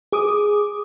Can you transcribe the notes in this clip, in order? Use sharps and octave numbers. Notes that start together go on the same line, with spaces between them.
G#4 D6 D#6